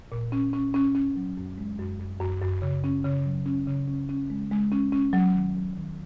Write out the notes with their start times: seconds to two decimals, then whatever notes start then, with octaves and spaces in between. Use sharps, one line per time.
0.12 A#2
0.32 C#4
0.53 C#4
0.74 C#4
0.95 C#4
1.16 F#3
1.37 F#2
1.58 G#3
1.79 F#2
1.99 F#2
2.20 F#2
2.42 F#2
2.62 C#3
2.84 C#4
3.05 C#3
3.25 F#3
3.46 C#4
3.67 C#3
3.88 C#4
4.09 C#4
4.30 G#3
4.51 G#3
4.72 C#4
4.92 C#4
5.13 F#3
5.34 D#3
5.55 F#3
5.77 D#3